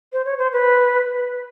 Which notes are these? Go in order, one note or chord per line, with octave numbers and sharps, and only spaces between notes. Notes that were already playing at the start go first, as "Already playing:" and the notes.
C5
C#5
C5
B4